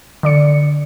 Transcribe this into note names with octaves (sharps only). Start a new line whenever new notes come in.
D3 D5 C#7